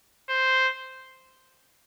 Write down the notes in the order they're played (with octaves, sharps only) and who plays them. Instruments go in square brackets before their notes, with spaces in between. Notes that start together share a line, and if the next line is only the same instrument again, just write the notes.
[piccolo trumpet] C5